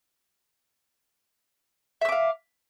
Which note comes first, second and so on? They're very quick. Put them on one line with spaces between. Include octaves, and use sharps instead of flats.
E5 E6 D6 F5